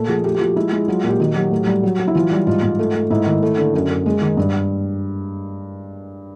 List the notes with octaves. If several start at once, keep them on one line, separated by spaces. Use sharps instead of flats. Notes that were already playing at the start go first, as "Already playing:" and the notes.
Already playing: A#2 A3 A4
F3 G#4
A3 G4
G4
F3 F#4
G#3 E4
G#3
F#3 F4
A#2
G4
D#3 F#4
F#3 G4
A2
G3
F#3
F#3
E4
E3 F4
G3
G#2 F4
G#2
A3
A3
G#2 E4
D#3
A3
D3
F#2
F#2
G#3
D#3
G2